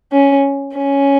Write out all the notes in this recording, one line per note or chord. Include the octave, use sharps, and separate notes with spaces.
C#4
C#4